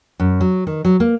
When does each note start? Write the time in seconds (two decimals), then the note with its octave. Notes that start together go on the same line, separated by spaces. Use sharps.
0.20 F#2
0.41 F#3
0.67 D#3
0.85 F#3
1.00 A#3